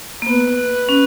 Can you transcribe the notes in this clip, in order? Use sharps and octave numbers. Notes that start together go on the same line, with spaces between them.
A#3
B3 B4 C5
C#4